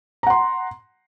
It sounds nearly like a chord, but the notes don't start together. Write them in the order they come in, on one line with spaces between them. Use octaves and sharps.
A#5 F#5 C6